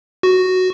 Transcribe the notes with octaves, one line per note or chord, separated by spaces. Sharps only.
F#4